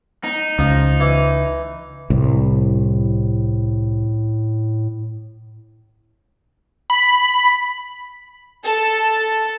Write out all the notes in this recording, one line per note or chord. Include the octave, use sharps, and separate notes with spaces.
D#4
C#2 F3
E3
C2 A2
B5
A4